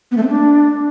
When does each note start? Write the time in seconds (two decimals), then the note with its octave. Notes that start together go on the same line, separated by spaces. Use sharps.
0.11 B3
0.17 A3
0.23 C4
0.29 D4